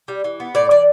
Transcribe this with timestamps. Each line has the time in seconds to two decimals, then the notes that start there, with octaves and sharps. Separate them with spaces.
0.08 G3
0.24 E3
0.40 B3
0.55 A2 D5
0.70 E3 D5